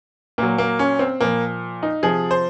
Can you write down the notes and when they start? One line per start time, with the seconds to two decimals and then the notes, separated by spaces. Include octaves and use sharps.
0.38 A#2 F#3 A#3
0.58 A#3
0.79 C#4
0.99 C4
1.20 A#2 F3 A#3
1.83 D#4
2.03 C3 F3 G#4
2.31 C5